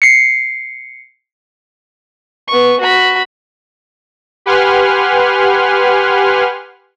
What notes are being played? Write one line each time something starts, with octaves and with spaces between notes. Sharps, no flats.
C7 C#7
B3 C#6
F#4 B5
G4 B4 F#5 G#5 C6 F6